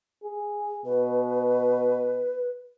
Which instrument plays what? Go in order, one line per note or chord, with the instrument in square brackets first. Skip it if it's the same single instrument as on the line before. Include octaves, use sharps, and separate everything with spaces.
[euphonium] G#4
[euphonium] B2 [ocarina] B4